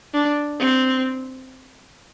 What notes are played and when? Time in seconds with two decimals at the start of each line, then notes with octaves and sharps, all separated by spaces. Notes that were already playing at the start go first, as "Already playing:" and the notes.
0.14 D4
0.60 C4